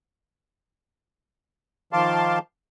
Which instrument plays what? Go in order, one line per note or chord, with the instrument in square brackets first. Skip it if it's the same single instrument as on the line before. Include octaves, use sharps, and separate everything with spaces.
[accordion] D#3 F3 F5 A5 C6 D6